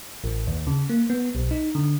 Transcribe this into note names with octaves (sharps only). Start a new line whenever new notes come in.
A1
D#2
C#3
A#3
B3
B1
D#4
D3